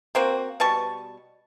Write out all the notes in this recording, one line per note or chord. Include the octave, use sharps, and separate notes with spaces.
A#3 C4 F#4
B2 G3 A5 C#6